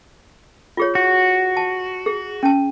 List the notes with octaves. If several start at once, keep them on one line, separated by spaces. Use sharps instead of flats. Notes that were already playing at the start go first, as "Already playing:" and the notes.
F4 G#4 C#5
F#4
A5
G#4
C#4 A5